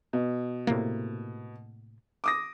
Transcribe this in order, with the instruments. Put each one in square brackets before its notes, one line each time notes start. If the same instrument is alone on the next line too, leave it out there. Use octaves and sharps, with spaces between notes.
[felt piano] B2
[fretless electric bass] A2 C3 A#3
[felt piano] D6 D#6 A#6